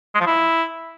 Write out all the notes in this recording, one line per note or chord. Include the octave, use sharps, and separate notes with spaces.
G#3
F3
E4